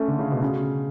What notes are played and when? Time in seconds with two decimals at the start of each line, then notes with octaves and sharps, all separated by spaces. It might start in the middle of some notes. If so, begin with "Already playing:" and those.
Already playing: A3 C#4
0.08 D3
0.19 C#3
0.31 B2
0.42 C#3